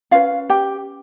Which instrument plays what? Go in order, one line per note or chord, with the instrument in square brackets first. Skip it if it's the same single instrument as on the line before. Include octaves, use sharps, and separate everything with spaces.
[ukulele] C#4 F4 B4 F5
G4 G5